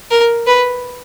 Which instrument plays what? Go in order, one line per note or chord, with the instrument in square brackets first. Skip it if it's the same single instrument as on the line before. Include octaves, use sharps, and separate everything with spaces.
[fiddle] A#4
B4